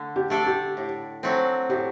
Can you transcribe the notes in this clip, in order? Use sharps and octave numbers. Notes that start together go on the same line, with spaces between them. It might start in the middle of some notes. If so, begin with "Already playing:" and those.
Already playing: D3 A3 A4
G4
A3 D4 A4 D5
G4
A2
F#3 A3 C4
A2 G4